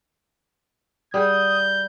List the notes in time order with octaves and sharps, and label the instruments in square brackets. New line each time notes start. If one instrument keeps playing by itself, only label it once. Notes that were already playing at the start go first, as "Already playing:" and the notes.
[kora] G3 G#4 F#5 [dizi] D#6 [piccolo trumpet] G6